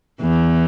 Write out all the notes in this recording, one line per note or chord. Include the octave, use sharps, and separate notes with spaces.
E2 E3